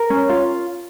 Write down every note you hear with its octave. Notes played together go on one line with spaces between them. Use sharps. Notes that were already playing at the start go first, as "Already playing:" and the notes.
Already playing: A#4
C#4
F4